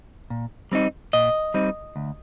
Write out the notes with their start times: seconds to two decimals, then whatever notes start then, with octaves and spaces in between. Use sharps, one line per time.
0.30 A#2
0.72 G3 C4 D#4
1.13 A#2 D#5
1.54 G3 C4 D#4
1.96 D2